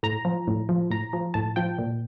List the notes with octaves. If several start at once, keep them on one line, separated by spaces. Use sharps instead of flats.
A2 A#5
F3
A2
F3
A2 A#5
F3
A2 A5
F3 G5
A#2